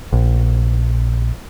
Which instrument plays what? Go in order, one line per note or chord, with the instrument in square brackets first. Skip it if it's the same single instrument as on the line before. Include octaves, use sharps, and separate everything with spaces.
[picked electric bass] A#1